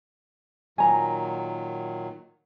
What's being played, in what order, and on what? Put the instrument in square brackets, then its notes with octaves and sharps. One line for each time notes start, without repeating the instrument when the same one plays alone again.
[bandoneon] A#2 D#3 F#3 [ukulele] G#5 A#5